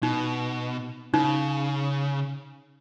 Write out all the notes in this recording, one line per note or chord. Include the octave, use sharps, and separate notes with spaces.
B2 D#4
C#3 D#4